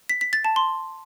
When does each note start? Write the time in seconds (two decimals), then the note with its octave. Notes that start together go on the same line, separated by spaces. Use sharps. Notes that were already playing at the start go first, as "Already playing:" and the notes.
0.09 B6
0.21 B6
0.33 A6
0.45 A5
0.56 C6